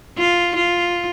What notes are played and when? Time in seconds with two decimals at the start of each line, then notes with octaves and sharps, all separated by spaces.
0.18 F4
0.56 F4